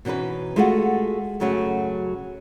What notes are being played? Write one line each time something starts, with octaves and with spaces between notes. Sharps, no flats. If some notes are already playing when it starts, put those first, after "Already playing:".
B2 E3 C#4 D#4 B4
G#3 A3 F4 F#4 E5 F#5
F#2 C#3 F#3 A3 C#4 F#4